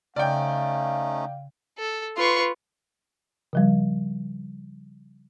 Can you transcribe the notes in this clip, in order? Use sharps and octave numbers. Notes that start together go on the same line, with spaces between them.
C#3 A3 C#4 D#4 D5 F5 G5
A4
F4 B4 C6 C#6
C#3 F3 G3